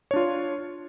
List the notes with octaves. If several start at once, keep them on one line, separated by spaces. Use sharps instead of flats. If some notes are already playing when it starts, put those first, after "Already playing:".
D4 F4 C#5